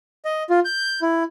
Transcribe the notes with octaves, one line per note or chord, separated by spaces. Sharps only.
D#5
F4
G6
E4